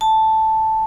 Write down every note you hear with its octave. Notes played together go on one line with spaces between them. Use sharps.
A5